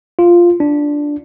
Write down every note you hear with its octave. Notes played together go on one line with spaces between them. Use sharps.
F4
D4